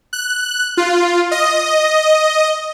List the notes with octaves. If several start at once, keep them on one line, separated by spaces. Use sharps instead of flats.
F#6
F4
D#5